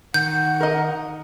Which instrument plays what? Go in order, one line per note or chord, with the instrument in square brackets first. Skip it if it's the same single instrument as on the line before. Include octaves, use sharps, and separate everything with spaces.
[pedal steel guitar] D#3 [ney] F#5 [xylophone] G6
[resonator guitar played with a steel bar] A#4 D#5